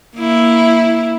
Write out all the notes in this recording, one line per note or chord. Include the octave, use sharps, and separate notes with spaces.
A#3 E4